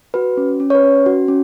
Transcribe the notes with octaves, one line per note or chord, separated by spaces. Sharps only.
F#4 B4
C#4
C#4
C#5
B4
C#4
F#4
C#4